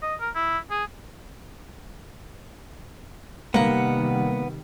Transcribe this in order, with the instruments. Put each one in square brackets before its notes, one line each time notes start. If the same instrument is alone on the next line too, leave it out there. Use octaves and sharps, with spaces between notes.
[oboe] D#5
A#4
E4
G#4
[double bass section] C3 D#3 G3 [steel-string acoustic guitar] A#3 F#5 [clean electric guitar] B3